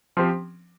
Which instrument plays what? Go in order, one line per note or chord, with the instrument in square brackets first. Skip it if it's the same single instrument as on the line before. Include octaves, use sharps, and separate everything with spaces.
[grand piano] F3 C4 G4